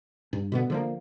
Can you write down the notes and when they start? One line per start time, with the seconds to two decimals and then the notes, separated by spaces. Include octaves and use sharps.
0.33 G2
0.52 B2 D3 B3
0.70 D3 F3 A#3